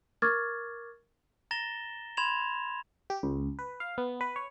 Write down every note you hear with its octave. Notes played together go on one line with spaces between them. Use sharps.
A#4 C#6 D6 F6 G#6 A6
A#5 A6 A#6 E7 G7
B5 C6 G#6 E7 F7
G4
C#2
B4
F5
B3
B4
C#5